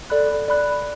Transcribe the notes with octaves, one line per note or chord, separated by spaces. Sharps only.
A4 D5 B5 F#6
D5 B5 F#6